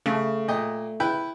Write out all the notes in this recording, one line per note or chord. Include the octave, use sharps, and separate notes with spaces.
C#3 A3
A#2 D#5 G5
E4 B4 G5